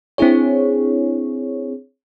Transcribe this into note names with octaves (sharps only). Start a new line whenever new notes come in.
C4 D4 E4 G#4 C#5